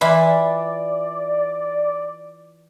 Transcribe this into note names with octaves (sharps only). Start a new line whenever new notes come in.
E3 E4 F4 D5